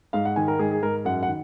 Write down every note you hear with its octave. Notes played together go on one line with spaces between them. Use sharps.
G#2 F5
F#5
D#3 G#5
A#4
G#2 G#4
G#4
G#2 A#4
F#2 F#5
F#5
D#3